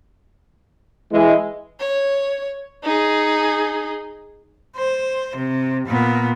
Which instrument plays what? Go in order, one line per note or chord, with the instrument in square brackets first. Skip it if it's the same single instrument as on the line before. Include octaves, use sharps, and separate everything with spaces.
[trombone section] E3 E4 [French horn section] G#3
[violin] C#5
D#4 G#4
[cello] C5
C3
A#2 B3